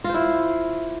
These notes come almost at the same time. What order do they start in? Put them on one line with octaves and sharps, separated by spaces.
F4 C5 E4